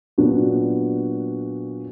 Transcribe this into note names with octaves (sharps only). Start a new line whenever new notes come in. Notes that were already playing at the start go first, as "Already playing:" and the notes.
A#2 F#3 B3 D4 F#4